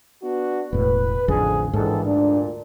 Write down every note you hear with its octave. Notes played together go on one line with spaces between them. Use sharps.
B3 D4 F#4
E1 A2 B4
A1 F2 D3 F3 G#4
A#1 D#2 G#2 D3 E3 A4
D2 A#2 D4